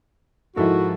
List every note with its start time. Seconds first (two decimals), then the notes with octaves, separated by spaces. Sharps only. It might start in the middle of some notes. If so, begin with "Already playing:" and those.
0.56 G#2 F3 G#3 E4 F#4 A4 A#4